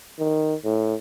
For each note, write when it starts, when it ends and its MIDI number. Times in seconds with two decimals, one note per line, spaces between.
0.19 0.54 51
0.65 0.95 45